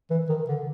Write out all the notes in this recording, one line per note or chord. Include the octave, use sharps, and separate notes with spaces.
E3
D#3
D3